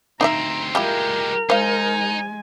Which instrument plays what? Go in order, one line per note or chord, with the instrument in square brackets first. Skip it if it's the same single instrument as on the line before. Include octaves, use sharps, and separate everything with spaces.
[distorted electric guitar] D2 C4 [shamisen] D#4 D#5 E5 [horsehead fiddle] A#5
[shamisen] G3 E4 F4 [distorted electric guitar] G#3 G4 [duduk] A#4 [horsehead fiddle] G5
[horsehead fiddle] G#3 G#5 [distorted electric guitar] D#4 [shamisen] C5 F5